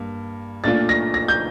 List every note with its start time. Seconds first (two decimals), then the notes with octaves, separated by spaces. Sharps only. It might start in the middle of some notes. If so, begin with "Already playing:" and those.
Already playing: G2 A#3
0.64 A#2 A3 D4 F4 A6
0.89 A#6
1.14 A#6
1.28 G6